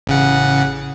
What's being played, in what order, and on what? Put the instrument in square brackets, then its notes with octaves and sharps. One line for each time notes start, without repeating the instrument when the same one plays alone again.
[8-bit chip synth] A1 C#3 F#5